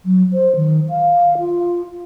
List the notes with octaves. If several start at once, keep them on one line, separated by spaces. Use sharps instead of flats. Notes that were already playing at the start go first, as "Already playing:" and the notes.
F#3
C5
D#3
F5
F4